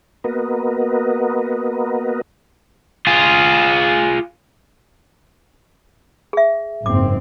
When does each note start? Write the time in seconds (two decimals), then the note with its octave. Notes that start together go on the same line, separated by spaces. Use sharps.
0.24 A#3 B3 F#4 A#4 B4 D#5
3.07 F4 G#4
6.33 G#4 E5
6.86 F#1 G#2 C4 D6